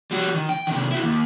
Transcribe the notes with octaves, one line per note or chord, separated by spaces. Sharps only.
G3 F#4
D#3
G5
C3 D#3
E4 F#4
D#2